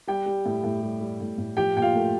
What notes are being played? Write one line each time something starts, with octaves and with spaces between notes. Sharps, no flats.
G3 G4 G5
G3
A2
A2
G3
G3
A2
A2
F3 G4 G5
A#2 G5
F4 F5
A3